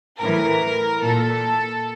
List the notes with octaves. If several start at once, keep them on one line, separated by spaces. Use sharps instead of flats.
A2 E3 A#4
A#2 A4